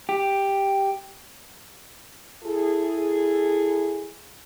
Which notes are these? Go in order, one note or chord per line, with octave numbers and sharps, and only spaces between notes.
G4
E4 G#4 A4